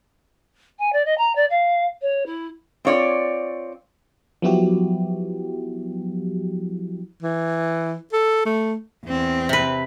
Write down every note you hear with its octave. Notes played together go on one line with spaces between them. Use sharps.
G#5
D5
D#5
A#5
D5
F5
C#5
E4
C4 F4 C#5 D5
F3 F#3 B3 E4 F#4 G4
E3
A4
A3
E2 C4
C3 B4